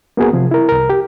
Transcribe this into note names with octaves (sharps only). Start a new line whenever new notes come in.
A#3 B3 F#4 G#4 A#4
C3 F3
E4 A#4
C2 A#4
G4